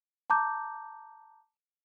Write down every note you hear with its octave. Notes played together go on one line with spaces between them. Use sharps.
A5 A#5 D6 G6